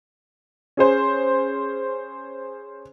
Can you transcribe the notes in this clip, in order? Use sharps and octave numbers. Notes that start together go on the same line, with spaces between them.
C#4 G#4 C5